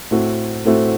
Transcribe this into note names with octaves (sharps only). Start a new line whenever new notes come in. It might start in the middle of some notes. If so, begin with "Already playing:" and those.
A2 A3 C4 F#4
A2 A3 C4 F#4